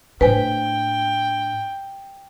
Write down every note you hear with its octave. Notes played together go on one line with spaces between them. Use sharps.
A2 D4 B4 C5 G5 G#5